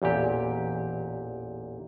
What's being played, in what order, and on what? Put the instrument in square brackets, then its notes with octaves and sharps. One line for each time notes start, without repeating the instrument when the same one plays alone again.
[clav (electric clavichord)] A1 E2 A#2 G4